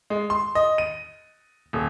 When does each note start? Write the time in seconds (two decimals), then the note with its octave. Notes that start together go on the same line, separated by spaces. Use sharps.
0.10 G#3
0.30 C6
0.55 D#5
0.78 D#7
1.73 D#1